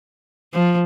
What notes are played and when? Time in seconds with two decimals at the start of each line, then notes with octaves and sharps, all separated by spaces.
0.53 F3